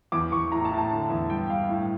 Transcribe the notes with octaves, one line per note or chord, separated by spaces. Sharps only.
E2 D6
E2 C#6
A2 A#5
A5
A2
A5
D3
E2
G2 G5
G2 F5
A2